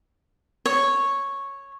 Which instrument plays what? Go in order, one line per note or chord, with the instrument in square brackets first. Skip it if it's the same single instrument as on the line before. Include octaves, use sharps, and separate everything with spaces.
[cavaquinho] C#5